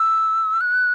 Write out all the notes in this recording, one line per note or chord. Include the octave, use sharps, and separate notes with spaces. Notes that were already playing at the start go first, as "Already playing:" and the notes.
Already playing: E6
F#6